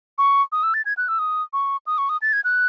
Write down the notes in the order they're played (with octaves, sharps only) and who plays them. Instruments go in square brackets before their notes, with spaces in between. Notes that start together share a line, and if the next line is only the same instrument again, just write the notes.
[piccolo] C#6
D#6
E6
A6
G#6
F#6
E6
D#6
C#6
D#6
C#6
D#6
A6
G#6
F#6